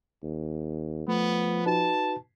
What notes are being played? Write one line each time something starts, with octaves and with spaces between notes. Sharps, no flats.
D#2
F3 A3 B3
D#4 F#4 B4 A5